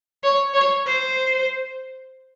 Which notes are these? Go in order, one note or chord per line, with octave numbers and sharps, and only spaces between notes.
C#5
C#5
C5